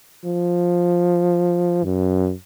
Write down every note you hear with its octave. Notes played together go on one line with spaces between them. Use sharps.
F3
F#2